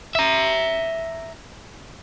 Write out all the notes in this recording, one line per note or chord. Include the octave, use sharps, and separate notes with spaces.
E5 A#5